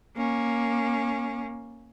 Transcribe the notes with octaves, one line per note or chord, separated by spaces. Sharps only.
A#3 C#4